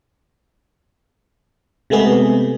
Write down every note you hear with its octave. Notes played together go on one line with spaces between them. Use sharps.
C3 G#3 A3 B3 G#4